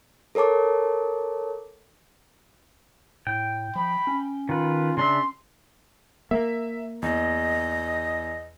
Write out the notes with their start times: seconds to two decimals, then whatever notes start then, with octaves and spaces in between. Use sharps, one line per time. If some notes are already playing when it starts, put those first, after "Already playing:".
0.35 A4 A#4 C#5 A5 D6
3.27 A2 G5
3.76 F3 B5
4.07 C#4
4.49 D#3 F4 B4
4.97 C#3 D4 E5 C6
6.31 A#3 E5
7.02 E2 D#5